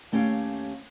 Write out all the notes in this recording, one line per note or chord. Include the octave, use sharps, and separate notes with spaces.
D#2 A3 C#4 G4 C#5 F5